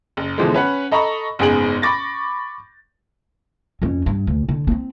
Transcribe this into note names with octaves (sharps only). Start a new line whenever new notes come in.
F#1
B2 D3 E3 F3 G#3
C#4 B4 F#5
A4 D#5 A#5 B5 C#6
F#1 G#2 B3 G#4 D7 F#7
B5 C#6 D6 A6 A#6
F2 C#4
G2
D2
D3
B3 C4